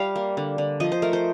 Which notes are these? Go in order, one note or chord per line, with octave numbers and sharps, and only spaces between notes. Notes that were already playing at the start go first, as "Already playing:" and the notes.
Already playing: G3 F5
A#3
D3
D3
F3 D#5
C5
A3 A#4
C5